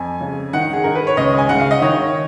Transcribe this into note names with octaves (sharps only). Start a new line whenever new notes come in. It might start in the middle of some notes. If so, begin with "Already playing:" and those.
Already playing: F2 G#5
C#3
D#3 F#5
G#4
D#3 A#4
B4
C#5
C#2 D#5
G#5
C#3 F#5
F5
D#5
D#3 C#5